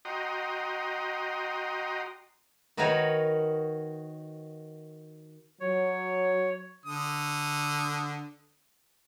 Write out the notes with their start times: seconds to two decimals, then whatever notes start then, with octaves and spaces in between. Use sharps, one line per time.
0.05 F#4 D#5 G5 A#5 C6 D#6
2.77 D#3 D#4 F#4 A#4 B4 C#5
5.60 F#3 C#5
6.86 D3 D#6